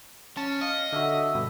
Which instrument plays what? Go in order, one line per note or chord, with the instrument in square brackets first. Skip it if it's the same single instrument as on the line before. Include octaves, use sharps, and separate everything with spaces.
[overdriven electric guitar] C#4 [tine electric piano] A5
[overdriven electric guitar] D#5 [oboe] F5
[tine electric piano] D3 F#4 [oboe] E5
[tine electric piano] G2 B2 D3